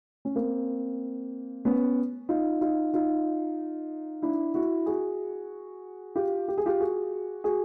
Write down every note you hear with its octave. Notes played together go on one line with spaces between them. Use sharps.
C#4
A#3 C4
B3 C#4
D#4 F4
D#4 F4
D#4 F4
D4 E4
E4 F#4
F#4 G#4
F4 G4
G4
G#4
F4 G4
F#4 G#4
F#4 G#4